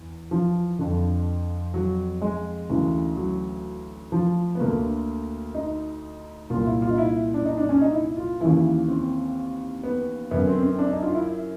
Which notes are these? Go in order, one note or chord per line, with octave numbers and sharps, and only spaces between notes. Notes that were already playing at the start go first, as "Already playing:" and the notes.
Already playing: E2
F3
F2 D3
F#3
G#3
D2 C#3 E3
F#3
F3
B3
D2 D3 A#3
D#4
C2 A#2 F4
E4
F4
D#4
E4
D4
D#4
D4
C#4
D#4
E4
F4
D#2 C#3 E3 E4
C4
B3
F#2 D3 B3
C4
C4
D4
D#4
F4
E4